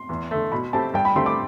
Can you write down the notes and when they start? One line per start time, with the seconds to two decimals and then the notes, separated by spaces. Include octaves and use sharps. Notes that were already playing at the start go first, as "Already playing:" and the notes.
Already playing: C6
0.09 E2
0.31 D3 A3
0.52 B2 B5
0.73 A3 C4 G4 A5
0.94 G2 G5
1.05 B5
1.16 D3 A3 C4 G4 C6
1.26 D6